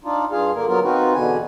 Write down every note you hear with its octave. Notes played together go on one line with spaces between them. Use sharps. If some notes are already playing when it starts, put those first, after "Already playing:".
D4 D#4 F4
G2 F4 G#4 F5
D3 A#3 A#4
F#3 B3 F4 A#4
C4 D#4 F4 F#4 B4
E2 B2 D3 G#5